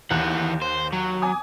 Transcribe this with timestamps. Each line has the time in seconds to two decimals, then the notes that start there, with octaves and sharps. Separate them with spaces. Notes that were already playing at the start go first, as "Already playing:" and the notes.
0.11 D#2 E3 F#5 F#6
0.62 C5
0.93 F#3
1.22 G#5 D6 D#6